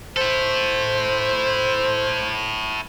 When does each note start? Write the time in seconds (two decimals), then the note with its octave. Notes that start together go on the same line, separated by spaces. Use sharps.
0.17 E4 A4 C5